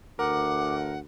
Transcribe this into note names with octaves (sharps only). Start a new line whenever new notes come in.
D2 A#4 F#5 D6